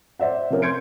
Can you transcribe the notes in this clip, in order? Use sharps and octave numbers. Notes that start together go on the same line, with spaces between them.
C5 D5 E5 F#5
C3 F3 C#4 A#4
C6 G6 G#6 C#7 D7